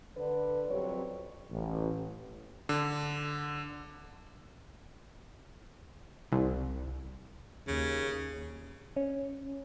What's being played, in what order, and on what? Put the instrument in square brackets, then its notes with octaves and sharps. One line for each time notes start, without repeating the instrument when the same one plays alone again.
[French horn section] D3 B4
F2 C3 F#3 G3 C#4 C#5
[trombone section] A1
[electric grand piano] D3
[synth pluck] C2
[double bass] D#2 [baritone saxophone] C#3
[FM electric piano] C#4